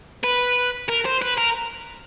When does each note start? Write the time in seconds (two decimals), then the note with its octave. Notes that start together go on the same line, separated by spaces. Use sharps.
0.24 B4
0.89 A#4
1.06 C5
1.22 B4
1.38 A#4